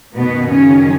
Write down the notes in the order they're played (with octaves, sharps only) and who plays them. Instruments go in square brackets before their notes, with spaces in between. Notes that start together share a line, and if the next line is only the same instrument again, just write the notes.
[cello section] F#2 B2 D#3 F#3 B3
C#3 C#4